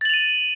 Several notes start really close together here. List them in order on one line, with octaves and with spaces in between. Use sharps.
A6 F#7 F7 D#7